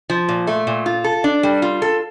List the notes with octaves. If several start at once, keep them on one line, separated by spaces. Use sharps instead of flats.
F3
A#2
A3
A#2
F4
A4
D4
G3
F4
A4